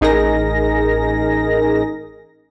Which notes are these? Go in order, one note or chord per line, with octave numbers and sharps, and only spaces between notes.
A1 D#4 G#4 A#4 A#6